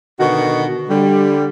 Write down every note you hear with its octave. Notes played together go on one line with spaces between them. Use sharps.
B2 D3 D#3 F#4
D3 G3